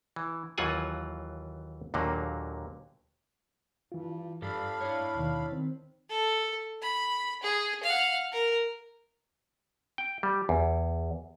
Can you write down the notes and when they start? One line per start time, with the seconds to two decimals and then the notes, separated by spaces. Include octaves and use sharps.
0.16 E3
0.58 D#2 E3 F#3 F4 F#5 G#5
1.94 D#2 A#2 D3 F#3 A#3
3.92 G2 E3 F4
4.42 G2 D4 G4 A4 F5 B5
4.81 E4 C#5
5.15 D#2 B2 D#3
5.52 D#3 C4
6.10 A4
6.82 B5
7.43 G#4
7.83 F5 F#5
8.32 A#4
9.98 G5
10.23 G3
10.49 E2